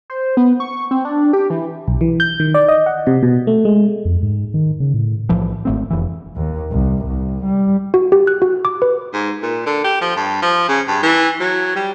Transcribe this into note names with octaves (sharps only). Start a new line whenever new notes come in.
C5
B3
C#6
C4
D4
G4
E3
B1
E3
G6
D#3
D5
D#5
F#5
C3
B2
A3
G#3
F2
G#2
D#3
C#3
A2
B1 A2 E3 F3
G#1 A3 C4
F1 E3
D#2
C2
C2
G3
F#4
G4
F#6
F#4
D6
B4
G#2
A#2
D3
G4
F3
G2
F3
C#3
G2
E3
F#3
G3